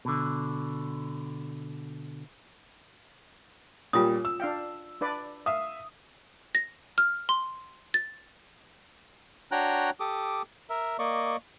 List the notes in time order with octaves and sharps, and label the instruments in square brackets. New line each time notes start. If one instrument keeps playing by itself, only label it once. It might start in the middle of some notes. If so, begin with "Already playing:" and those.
[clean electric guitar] B2 D3
[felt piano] A#2 G3 [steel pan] C#4 [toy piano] F4 D#6
[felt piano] E6
[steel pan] D4 F5 G5
D4 B4 D5
[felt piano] E5 D#6 [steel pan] F5
[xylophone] A#6
F6
C6
A6
[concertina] D4 F#4 C#5 G5 A#5 F#6
G4 A4 D6 D#6
A#4 E5
A#3 D5 D#5 C#6